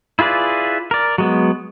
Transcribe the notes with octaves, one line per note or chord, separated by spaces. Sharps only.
E4 F4 G#4 B4 D5
A#4 D5
F#3 G#3 B3